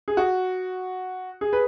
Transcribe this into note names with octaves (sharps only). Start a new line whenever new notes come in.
G#4
F#4
G#4
B4